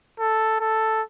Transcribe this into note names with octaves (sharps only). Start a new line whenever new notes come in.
A4
A4